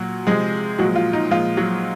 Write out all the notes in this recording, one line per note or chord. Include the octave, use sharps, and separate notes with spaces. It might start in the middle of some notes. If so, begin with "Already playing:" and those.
Already playing: A#2 F#3 F#4
C3 F3 G#3 G#4
A#2 F3 F#3 G#3 F#4
F4
D#4
A#2 F3 G#3 F4
F#3 F#4